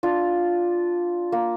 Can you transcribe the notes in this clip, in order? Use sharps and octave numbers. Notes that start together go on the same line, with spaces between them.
D4 F4
A#3